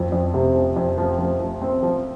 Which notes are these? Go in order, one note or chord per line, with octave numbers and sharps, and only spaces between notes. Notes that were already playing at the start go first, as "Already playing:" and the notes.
Already playing: F2 F3
F2
C3
F3
F2
F3
F3
F3
C4
F3